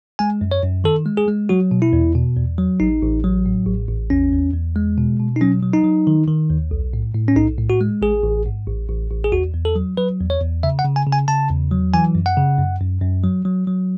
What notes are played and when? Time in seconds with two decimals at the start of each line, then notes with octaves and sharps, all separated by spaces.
0.19 G#3 G#5
0.41 F#2
0.51 C#5
0.63 F#2
0.84 D#3 A4
1.06 G#3
1.17 G#4
1.28 G#3
1.49 F#3 F#4
1.71 B2
1.82 E4
1.93 E2
2.15 B2
2.37 E2
2.58 F#3
2.80 A1 D#4
3.03 A1
3.24 F#3
3.46 A2
3.67 A1
3.89 A1
4.10 E2 C#4
4.32 E2
4.54 E2
4.76 G#3
4.98 B2
5.20 B2
5.36 D#4
5.41 F#3 C#4
5.63 F#3
5.74 D#4
5.84 F#3
6.07 D#3
6.28 D#3
6.50 D#2
6.71 B1
6.93 A2
7.15 A2
7.28 C#4
7.36 B1 D#4
7.58 A2
7.70 F#4
7.81 G#3
8.02 A1 G#4
8.24 A1
8.46 G#2
8.68 A1
8.89 A1
9.10 A1
9.24 G#4
9.32 E2 F#4
9.54 E2
9.65 A4
9.75 F#3
9.97 F#3 B4
10.20 E2
10.30 C#5
10.41 E2
10.63 C#3 E5
10.79 F#5
10.85 C#3
10.96 G#5
11.07 C#3
11.13 G#5
11.28 C#3 A5
11.50 E2
11.71 F#3
11.94 E3 G#5
12.15 F#2
12.26 F#5
12.37 C#3
12.58 F#2
12.81 F#2
13.02 F#2
13.24 F#3
13.45 F#3
13.67 F#3